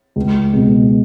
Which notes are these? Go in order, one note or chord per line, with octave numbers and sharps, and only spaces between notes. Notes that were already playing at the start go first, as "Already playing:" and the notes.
C#2
B2 G#3